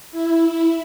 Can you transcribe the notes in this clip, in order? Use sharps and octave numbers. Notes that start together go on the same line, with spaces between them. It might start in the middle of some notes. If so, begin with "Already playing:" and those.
E4